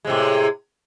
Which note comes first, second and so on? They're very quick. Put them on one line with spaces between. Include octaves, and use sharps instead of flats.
G#3 C3 A2